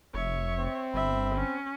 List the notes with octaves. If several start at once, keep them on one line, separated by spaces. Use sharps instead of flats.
F1 C#5 E5
C4
G1 E5 B5
C#4